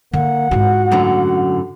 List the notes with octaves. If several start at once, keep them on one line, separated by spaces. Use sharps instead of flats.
D3 A#3 F#5
G#2 F4 F#4
F#2 A2 D3